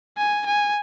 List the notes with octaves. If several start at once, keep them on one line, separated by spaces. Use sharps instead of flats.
G#5
G#5